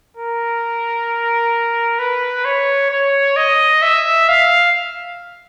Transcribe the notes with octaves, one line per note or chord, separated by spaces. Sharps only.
A#4
B4
C#5
C#5
D#5
E5
F5